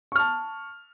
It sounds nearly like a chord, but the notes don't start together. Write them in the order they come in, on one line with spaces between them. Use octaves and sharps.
C#6 F6 A5